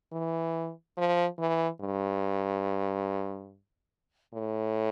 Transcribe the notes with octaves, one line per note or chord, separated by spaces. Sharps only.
E3
F3
E3
G2
A2